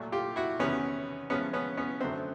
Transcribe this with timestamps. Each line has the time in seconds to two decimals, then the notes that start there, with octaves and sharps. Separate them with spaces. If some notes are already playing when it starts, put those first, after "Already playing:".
Already playing: A#2 F#3 A3
0.12 F4 G4
0.36 E4 F#4
0.60 E2 C3 D#3 B3 C#4
1.30 A2 F3 G#3 B3 C#4
1.53 B3 C#4
1.77 B3 C#4
2.00 F#2 D3 F#3 A3 C4